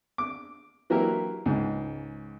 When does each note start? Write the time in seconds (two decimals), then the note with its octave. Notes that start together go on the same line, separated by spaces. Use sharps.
0.18 D6
0.90 E3 F#3 A#3 E4 G4 A#4
1.46 C#2 G#2